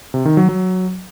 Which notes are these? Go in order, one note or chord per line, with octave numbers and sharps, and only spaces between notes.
C3
D#3
F#3
F#3